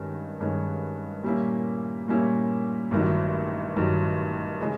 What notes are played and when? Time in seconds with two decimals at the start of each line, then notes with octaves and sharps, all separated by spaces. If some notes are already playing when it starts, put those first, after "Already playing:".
Already playing: G2 D#3 G#3 C#4
0.40 G2 D#3 G#3 C#4
1.23 A#2 G3 A#3 C#4 E4
2.08 A#2 G3 A#3 C#4 E4
2.91 A1 G2 D#3 F#3
3.76 A1 G2 D#3 F#3
4.61 C#3 E3 G#3